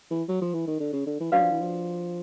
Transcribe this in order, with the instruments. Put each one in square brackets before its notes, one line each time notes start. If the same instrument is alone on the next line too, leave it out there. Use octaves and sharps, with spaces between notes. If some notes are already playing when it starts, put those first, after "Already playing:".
[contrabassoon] E3
F#3
F3
E3
D#3
D3
C#3
D3
E3
[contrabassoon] F#3 [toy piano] D4 F#4 B4 D5 F5
[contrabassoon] F3
E3
F3